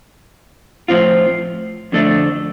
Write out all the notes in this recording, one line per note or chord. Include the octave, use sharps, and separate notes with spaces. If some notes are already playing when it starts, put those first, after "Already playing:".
A2 F3 C4 F4
F2 D3 A3 D4